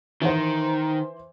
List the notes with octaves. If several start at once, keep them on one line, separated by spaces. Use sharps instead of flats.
D#3 E3 C5